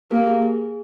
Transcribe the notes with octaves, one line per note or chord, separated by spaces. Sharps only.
A#3 G4 A#4
G#4
G#4